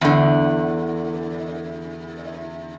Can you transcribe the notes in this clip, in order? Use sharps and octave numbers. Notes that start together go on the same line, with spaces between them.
E2 D3